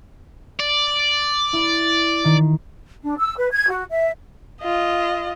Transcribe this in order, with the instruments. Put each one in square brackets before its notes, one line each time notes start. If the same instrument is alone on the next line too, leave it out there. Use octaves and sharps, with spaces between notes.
[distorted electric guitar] D5
[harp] E4
D#3
[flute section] D4
E6
B4
G#6
F#4
E5
[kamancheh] F4 D#5